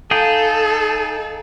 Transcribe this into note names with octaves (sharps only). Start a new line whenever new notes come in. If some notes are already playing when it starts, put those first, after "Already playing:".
D#4 G#4 A4 F5 G5